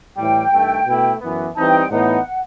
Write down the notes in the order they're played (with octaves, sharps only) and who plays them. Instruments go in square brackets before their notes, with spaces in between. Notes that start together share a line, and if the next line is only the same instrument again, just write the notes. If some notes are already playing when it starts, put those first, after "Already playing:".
[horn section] A2 E3 G3 [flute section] G5
[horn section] G2 D#3 A3
B2 A3 E4
F#2 E3 B3
[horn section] E3 G3 C4 D#4 [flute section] A5
[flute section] G5
G5
[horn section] A2 E3 B3 D#4 [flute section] F#5